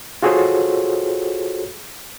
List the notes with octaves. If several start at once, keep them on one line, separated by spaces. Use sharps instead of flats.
F4 F#4 G#4 A4 C5 C#5